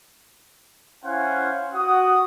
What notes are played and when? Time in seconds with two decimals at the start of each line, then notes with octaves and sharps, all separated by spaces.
1.04 C#4 E4 C5 F5 F#5 G#5
1.74 F#4 F#5 D#6